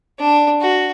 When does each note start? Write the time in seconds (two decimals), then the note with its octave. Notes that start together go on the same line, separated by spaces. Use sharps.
0.19 D4
0.61 F#4